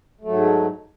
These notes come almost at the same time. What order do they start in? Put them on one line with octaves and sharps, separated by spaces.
A3 F#3 G#2